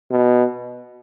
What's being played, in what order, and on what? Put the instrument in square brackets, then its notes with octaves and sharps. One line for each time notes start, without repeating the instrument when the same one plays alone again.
[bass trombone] B2